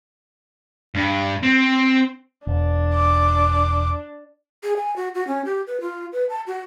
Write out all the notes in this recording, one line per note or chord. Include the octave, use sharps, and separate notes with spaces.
G2
C4
E1 D4
D6
G#4
G#5
F#4
F#4
C#4
G4
B4
F4
B4
A5
F#4